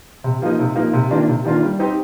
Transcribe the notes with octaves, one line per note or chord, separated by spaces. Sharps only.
C3
F3 A#3 D#4
C3
F3 A#3 D#4
C3
D#3 A#3 D4 F4
C3
D#3 A#3 D4 F4
G3
C4 D#4 G4